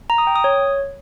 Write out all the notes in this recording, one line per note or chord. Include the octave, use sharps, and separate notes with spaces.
A#5
D#6
G5
D#6
C#5